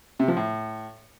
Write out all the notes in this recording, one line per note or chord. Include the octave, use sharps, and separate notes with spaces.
C3
F3
A2